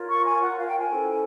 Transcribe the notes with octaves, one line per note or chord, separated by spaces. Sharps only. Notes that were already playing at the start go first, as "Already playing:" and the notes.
Already playing: F4 A#4 C#5
C#6
G#5
F#5
F5
G5
G#5
C#4 E4 A4 C5